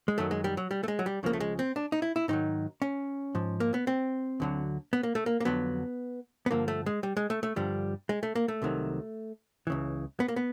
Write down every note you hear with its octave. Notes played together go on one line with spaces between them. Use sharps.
G#3
F#2 D#3 F#3 A3
G#3
G3
F#3
G3
A3
G#3
F#3
G3
C#2 C#3 F3 A#3
A3
G#3
C4
D4
D#4
E4
E4
G#2 D#3 F#3 D#4
C#4
G#2 F3
A#3
B3
C4
D2 D3 F#3
B3
A#3
A3
A#3
A#3
F2 D3 F#3 B3
B3
G2 D3 F3 A#3
A3
G#3
G3
G#3
A3
A3
G2 D3 F3 G3
G#3
A3
A#3
A3
C2 C3 D#3 F#3
C#2 C#3 E3
B3
A#3
B3